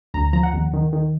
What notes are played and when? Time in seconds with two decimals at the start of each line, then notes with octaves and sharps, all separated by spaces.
0.14 D2 A#5
0.33 F3 A#5
0.43 F#5
0.53 D#2
0.73 D#3
0.93 D#3